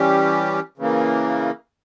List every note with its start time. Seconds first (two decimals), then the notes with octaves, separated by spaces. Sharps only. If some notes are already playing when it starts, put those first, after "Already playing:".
Already playing: E3 G3 C#4 G4
0.78 C#3 E3 A#3